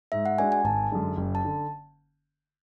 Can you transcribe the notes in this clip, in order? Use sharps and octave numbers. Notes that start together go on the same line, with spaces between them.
G#2 E5
F#5
G#3 D4 F#4 G#5
G#5
G#1 A5
F#2 D3 G#3
F#1
A5
D3